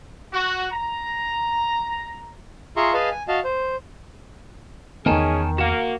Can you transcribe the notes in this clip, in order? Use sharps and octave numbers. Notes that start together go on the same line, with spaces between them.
F#4
A#5
F4 G#4 E5 A#5 C6 C#6
G#4 B4 D#5 F5 G#5 A5
G#5
F#4 D#5 F5 A5
C5
E2 D#3 B3 C#4 G#4 A#4 G#5 A5
A#3 F#4 F#5 E7